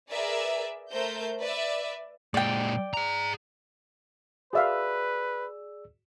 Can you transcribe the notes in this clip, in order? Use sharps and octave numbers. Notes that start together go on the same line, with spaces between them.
G#4 A#4 B4 D5 E5
A3 A#4 C5 G6
B4 D5 E5
A#2 G#3 D5 G5
G#4 A#5
F#4 G#4 B4 D5 E5 F5 E6